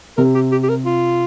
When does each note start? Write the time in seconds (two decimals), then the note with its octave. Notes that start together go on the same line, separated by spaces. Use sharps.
0.17 C3 A#4
0.35 G4
0.52 G4
0.63 G4
0.69 A#4
0.85 F4